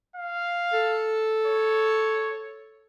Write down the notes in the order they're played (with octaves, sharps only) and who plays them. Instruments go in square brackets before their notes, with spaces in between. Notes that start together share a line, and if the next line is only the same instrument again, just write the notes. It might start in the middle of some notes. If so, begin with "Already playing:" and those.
[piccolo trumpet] F5
[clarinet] A4
[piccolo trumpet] C#5